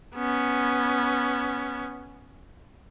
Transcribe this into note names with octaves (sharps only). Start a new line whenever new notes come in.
B3 C#4